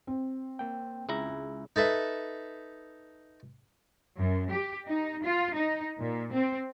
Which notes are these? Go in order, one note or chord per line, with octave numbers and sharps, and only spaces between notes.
C4
A#3 G5
C#2 E4 G#4 A#5
D#4 A4 B4 E5
F#2
G4
D#4
F4
D#4
A#2
C4